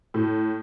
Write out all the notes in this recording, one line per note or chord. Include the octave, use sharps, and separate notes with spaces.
A2